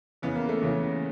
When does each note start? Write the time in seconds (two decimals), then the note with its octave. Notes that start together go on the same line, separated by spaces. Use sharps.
0.22 E2 C#3 E3 B3
0.36 A#3
0.49 A3
0.61 E2 C#3 E3